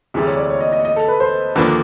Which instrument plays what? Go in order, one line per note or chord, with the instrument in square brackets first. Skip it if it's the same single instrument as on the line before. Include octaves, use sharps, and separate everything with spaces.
[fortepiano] D2 C3 E3 G3 [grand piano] G#4
[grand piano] C#5
D5
C#5
D#5
D#5
D#5
A4
B4
C5
[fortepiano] D#2 D3 F3 A#3 D4 [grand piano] B4